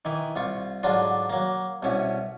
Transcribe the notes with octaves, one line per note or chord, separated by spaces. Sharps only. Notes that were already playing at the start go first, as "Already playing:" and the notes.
D#3 E3 E4
C2 F4 C#6
G#2 D3 F#3 D4 F4
F#3 A#3
C2 B2 C#4 E4